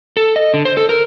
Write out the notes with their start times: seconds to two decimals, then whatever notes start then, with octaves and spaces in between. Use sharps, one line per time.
0.17 A4
0.36 D#5
0.54 D3
0.65 C5
0.77 A4
0.89 A#4